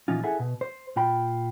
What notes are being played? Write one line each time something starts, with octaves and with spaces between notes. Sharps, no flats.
A#2 E3 F3 C#4 D#4 F4
E4 G#4 A4 E5 F#5 G#5
B2
C5
A#2 F4 G5 B5